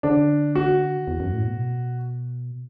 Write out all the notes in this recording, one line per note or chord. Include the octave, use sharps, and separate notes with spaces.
D3 D4
F#4
E2
F#2
A2
B2